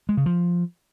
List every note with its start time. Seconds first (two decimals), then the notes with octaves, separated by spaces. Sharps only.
0.09 G#3
0.17 C#3
0.26 F3